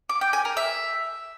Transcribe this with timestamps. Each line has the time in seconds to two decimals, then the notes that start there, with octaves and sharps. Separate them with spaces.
0.09 D6
0.21 G5
0.33 G#5
0.45 A#4
0.57 E5